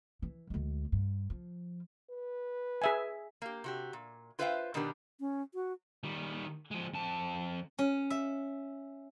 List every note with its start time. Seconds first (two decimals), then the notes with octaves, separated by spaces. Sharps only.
0.22 E3
0.50 D2 G#3
0.92 G2
1.30 F3
2.11 B4
2.82 G#4 E5 G#5
3.42 A#3 G4
3.64 C3 F#4 G4
3.93 A#2
4.39 F4 B4 C5 E5 F5 G5
4.74 B2 D#3 B3 D4 G4 A#4
5.20 C#4
5.54 F#4
6.04 D#3 G3
6.71 F3 G#3
6.94 F2 A5
7.79 C#4
8.10 E5